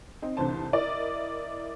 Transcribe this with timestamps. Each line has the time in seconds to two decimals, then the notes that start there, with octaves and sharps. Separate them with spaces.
0.22 C4 D#4
0.37 F1 C2 D3 E3 C5 A5
0.73 E4 A#4 D5 D#5